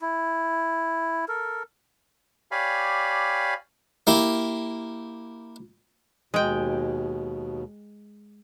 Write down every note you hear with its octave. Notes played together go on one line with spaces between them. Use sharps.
E4
A4 A#4
G4 C#5 D5 F5 G#5 B5
A#3 E4 G4
D#2 B2 G#3 G5